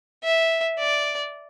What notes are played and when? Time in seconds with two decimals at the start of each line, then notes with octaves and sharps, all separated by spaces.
0.24 E5
0.78 D5